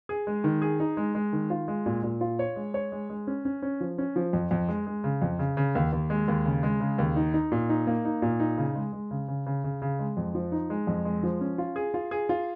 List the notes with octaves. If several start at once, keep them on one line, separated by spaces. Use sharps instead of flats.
G#4
G#3
D#3
G#4
D#4
G#3
G#3
D#3
F4
G#3
A#2
A#2
F4
C#5
G#3
C#5
G#3
G#3
C#4
C#4
C#4
F3
C#4
F3
F2
F2
G#3
G#3
C#3
F2
C#3
C#3
D#2
D#2
G#3
D#2
C#3
G#3
C#3
D#2
D#4
D#4
A#2
D#4
A#3
D#4
A#2
D#4
C#3
G#3
G#3
C#3
C#3
C#3
C#3
C#3
G#3
F2
F3
D#4
G#3
F2
G#3
F3
C#4
F4
G#4
F4
G#4
F4